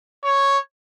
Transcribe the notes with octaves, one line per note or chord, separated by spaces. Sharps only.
C#5